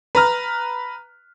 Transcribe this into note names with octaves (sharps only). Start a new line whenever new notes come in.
B4 A#5 F6